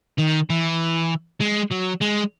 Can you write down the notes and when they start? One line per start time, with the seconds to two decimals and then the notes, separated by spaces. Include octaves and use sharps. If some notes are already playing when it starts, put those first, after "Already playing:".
0.19 D#3
0.50 E3
1.40 G#3
1.71 F#3
2.01 G#3